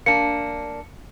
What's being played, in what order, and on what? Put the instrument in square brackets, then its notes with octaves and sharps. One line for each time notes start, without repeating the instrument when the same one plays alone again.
[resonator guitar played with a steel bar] A#3 D4 [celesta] C#7